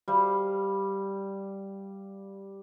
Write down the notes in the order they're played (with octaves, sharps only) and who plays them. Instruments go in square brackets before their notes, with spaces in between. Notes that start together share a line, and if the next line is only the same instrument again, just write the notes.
[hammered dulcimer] G3 F5